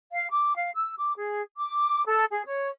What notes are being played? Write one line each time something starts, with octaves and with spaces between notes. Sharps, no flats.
F5
D6
F5
E6
D6
G#4
D6
A4
G#4
C#5